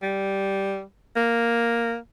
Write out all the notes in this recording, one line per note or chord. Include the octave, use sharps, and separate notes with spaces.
G3
A#3